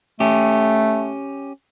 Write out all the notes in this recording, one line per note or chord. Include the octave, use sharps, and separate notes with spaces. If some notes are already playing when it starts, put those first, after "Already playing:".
A3 C#4 G4